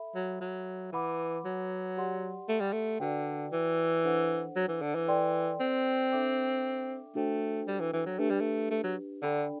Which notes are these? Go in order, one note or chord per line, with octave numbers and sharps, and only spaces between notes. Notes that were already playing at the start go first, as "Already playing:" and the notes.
Already playing: A4 E5 B5
F#3
F#3
E3 B4 F#5 B5 D6
F#3
G4 D5 F#5 C6
A3
G3
A3
D3 F#4 B4 D5 G5
E3
D4 A4 C5 F#5
F#3
E3
D3
E3
A4 D5 G5 C6
C4
D4 A4 E5 G5 D6
A3 D4 F#4 A4 C5 G5
G3
E3
E3
F#3
A3 D4 G4 B4
G3
A3
A3
F#3
D3 D4 A4 D5 G5 B5